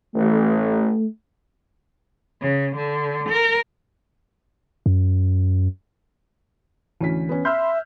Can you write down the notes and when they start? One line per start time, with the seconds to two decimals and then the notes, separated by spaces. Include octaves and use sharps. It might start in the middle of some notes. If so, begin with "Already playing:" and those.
0.15 A1 A3
2.41 C#3
2.76 D3
3.29 A#4
4.86 F#2
7.01 D2 E3 C#4 B6
7.29 B3 C#4
7.45 E5 B5 C6 E6 F6 G6